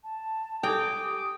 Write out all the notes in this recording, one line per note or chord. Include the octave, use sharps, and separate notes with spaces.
A5
G4 A4 G5 G#5 D6 D#6